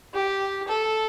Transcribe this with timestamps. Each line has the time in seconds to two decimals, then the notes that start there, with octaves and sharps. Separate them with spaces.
0.14 G4
0.68 A4